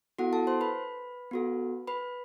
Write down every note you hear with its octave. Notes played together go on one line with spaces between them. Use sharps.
B3 E4 F#4 A4 F#5
A4 A5
C5 C6
B4 B5
B3 F#4 A4
B4 B5